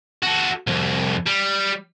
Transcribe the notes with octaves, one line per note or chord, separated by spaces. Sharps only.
F#4 A4
C2 F2
G3